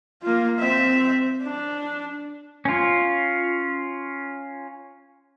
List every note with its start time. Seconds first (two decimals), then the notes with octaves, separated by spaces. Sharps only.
0.22 A#3 F4
0.59 C4 E5
1.42 D4
2.65 C#4 F4